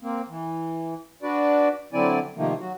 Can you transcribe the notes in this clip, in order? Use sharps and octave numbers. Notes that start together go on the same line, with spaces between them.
A#3 C4
E3
D4 F#4 B4 D5
D3 F#3 C4 E4 D5 G#5
C3 D#3 F3 A3 A#3
F#3 F#4